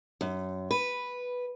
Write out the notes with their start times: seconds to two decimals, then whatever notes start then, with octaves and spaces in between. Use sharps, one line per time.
0.21 F#2
0.71 B4